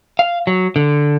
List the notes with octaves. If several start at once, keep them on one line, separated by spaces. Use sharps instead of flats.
F5
F#3
D3